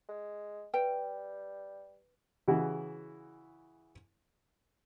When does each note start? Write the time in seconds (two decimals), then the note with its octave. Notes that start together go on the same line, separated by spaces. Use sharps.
0.09 G#3
0.74 G3 B4 G5
2.48 C#3 E3 E4 F#4